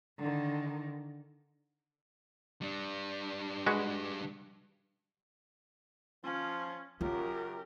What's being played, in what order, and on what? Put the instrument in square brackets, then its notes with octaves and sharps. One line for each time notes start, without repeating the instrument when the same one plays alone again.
[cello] D3 D#3
[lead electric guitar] G3 D4
[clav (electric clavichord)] G#3 F#4 B4
[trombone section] F3 F4 [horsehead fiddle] C#4
[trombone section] F#2 C#3 [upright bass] F4 [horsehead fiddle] G4 A#4